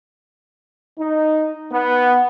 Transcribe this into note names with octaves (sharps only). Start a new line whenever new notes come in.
D#4
B3